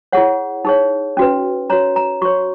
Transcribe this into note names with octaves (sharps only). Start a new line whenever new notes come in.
E4 G#4 C#5 F#5
D#4 G#4 C#5
C#4 F#4 B4
F#4 C#5 A#5
A#5
F#4 C#5 C#6